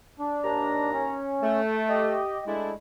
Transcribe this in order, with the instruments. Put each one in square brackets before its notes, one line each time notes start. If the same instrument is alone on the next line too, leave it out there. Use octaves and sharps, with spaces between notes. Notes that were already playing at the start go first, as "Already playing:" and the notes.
[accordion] D4
[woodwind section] D#2 A#5
[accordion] C#4
[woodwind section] A3
[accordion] G4 D#5
[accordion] G#3 [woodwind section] A3 D4 E4